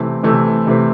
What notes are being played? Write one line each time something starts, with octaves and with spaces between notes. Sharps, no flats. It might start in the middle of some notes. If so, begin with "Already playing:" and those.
Already playing: C3 E3 A3 C4
C3 E3 A3 C4
C3 E3 A3 C4